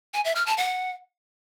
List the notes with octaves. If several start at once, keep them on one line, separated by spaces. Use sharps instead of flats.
G#5
E5
F6
A5
F#5